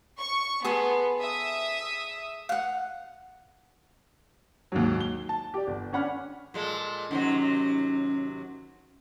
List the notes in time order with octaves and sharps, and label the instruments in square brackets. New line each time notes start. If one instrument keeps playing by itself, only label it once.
[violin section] C#6
[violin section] B3 [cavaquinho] G#4 A4 C6
[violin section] E5 D#6
[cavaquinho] F5 F#5
[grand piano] D#2 G#2 F#3
G7
A5
G4 D5
G1
C#4 D4 F#5 B5 F6
[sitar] A#2 G#3 A4
[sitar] D#2 C3 F#3 [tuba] C#4